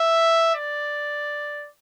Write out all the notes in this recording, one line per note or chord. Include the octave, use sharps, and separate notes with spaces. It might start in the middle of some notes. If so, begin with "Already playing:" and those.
Already playing: E5
D5